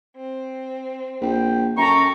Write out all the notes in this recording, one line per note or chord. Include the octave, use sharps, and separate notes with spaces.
C4
A#1 G5
F#2 A4 G5 A#5 C#6